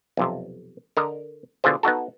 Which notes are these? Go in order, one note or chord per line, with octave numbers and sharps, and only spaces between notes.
B1 F2 C3
D3 A#4 D#5
B2 D3 F4 G#4 C5
B3 D#4 F#4 A4